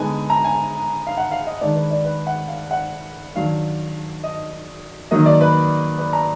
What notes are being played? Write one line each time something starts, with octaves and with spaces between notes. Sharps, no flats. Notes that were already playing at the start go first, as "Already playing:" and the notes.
Already playing: D3 G#3 B3 D#4 G#5
A#5
G#5
F5
F#5
F5
D#5
D#3 G#3 D4 D5
B4
D5
B4
F#5
F5
F#5
D#3 F#3 D4 F5
D#5
D#3 F#3 A#3 D#4 D#5
D5
B4
B4
A#5